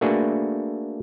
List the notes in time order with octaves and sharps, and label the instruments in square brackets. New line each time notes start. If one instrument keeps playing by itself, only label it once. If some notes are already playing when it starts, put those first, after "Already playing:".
[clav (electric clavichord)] A3 A#3 D4 F#4 G#4 B4